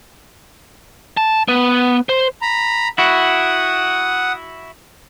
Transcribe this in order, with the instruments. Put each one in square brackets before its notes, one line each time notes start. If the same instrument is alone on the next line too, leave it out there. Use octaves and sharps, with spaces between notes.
[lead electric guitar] A5
B3
C5
[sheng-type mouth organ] A#5 B5
[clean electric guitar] E4 F#4 [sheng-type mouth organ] F#5 D#6